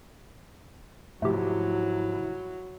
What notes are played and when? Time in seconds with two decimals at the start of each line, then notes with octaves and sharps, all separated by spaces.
1.22 G#2 C3 F3 F#3 A3 E4 G4